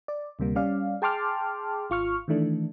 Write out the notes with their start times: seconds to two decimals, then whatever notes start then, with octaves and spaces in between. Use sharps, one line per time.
0.08 D5
0.39 D2 C3 G3 A#3
0.55 G3 C#4 D5 F5
1.02 G#4 G5 A5 C6 D6 F6
1.90 G#1 F4 C#6 F6
2.28 D#3 E3 A3 D4